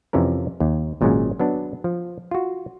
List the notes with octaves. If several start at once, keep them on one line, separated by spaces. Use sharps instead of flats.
F2 C3 E3 C#4 A#4
D#2
G#1 A#2 C#3 F#3 G#3 C#4
F#3 B3 D4
F3
F4 F#4